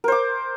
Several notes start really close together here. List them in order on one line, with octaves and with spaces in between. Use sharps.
A#4 C5 D6